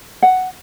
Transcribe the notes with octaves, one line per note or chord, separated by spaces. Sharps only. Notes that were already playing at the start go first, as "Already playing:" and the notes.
F#5